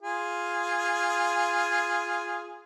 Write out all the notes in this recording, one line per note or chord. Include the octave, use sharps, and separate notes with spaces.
F4 G#4